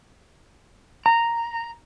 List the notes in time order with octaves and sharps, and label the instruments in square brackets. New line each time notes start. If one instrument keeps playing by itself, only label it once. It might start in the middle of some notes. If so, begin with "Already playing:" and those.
[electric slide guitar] A#5